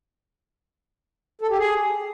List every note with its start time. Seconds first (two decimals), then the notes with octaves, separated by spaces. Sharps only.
1.41 A4
1.50 G4
1.59 G#4